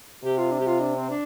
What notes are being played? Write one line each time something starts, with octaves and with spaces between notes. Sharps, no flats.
C3 G4
F4
D4
G4
F4
D4
C4
D4